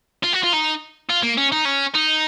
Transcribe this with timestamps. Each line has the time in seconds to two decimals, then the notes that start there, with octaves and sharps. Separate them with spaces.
0.24 F4
0.34 F#4
0.44 F4
0.53 D#4
1.10 F4
1.23 A#3
1.38 C#4
1.52 D#4
1.65 C#4
1.95 D#4